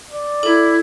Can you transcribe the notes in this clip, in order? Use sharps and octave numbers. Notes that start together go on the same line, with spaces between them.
D5
E4 A4